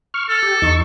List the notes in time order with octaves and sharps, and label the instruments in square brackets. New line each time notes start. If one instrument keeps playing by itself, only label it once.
[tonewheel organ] C#6 F6
[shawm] A4 [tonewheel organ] F6
[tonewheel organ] G4
E2 D#4 C#6